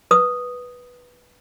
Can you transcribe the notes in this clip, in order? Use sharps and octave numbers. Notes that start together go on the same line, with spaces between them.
B4 D#6